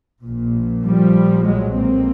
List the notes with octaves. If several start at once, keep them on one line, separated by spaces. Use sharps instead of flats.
A#1 A#2
F3 G3
B1 A2 F#3 G#3
A#3 C4